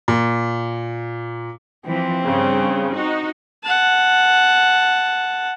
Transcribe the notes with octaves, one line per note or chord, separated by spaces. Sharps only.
A#2
E3 F3 C4
G2 C#3
D#4 F#4
F#5 A5